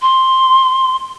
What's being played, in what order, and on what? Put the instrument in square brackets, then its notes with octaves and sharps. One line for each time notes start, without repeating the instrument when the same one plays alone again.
[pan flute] C6